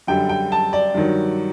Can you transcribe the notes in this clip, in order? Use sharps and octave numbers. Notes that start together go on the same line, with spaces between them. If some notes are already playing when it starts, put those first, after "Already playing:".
F#2 D3 G3 G5
G5
A5
D5
G2 D#3 F#3